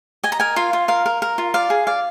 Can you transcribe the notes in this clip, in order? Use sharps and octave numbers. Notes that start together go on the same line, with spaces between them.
D#5 G#5
A#5
A#4 G#5
F4 F5
F4
A#4 F5
A#4
A#4
F4
D5 F5
G#4
D5 F5